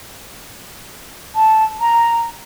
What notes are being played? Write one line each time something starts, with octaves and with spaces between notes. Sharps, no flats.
A5
A#5